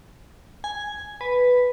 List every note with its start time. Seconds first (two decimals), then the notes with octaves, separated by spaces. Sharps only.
0.64 G#5
1.21 B4